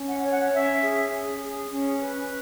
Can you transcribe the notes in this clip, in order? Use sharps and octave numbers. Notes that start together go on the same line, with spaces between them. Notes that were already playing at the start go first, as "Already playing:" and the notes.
Already playing: C#4
F#5
C#5
F#5
C#4 E5
G#4
C#4
G#4
C#4
B4